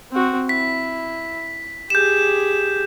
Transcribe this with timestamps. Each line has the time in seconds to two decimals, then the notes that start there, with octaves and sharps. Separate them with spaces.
0.12 C4 F#4
0.49 E4 B6
1.90 G4 G#4 G6 E7